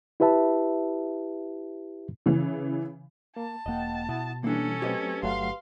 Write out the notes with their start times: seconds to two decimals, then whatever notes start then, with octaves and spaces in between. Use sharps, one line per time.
0.20 E4 G4 B4 E5 A5
2.26 C#3 E3
3.36 A#3 A5
3.66 E1 A#3 D#5 F#5 G5
4.09 B2 E4 F#5 D#6
4.44 E3 G3 A#3 C#4 D4 A4
4.82 F#3 A3 C4 G4 B4 D#5
5.23 G1 F#3 A3 F5 F#5 C6